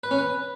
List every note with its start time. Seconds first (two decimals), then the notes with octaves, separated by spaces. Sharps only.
0.03 B4
0.11 C#4
0.19 B4